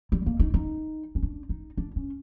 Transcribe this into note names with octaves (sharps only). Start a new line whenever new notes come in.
G3
A#3
D#4
D#4
C#4
D4
D#4
D4
C#4